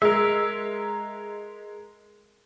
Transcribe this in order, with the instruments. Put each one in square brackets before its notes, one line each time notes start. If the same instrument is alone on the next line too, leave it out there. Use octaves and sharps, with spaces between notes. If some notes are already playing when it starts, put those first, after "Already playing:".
[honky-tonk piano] G#3 [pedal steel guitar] A#4 E5